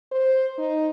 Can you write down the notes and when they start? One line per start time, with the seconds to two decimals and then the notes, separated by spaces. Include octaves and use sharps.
0.12 C5
0.58 D#4